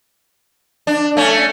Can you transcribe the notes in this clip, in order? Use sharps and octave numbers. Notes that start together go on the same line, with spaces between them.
D4
A3 C#4